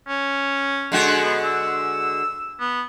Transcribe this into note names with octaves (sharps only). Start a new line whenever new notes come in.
C#4
D3 G#3 F#4
B3
E6
B3